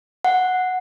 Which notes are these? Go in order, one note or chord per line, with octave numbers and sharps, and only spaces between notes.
F#5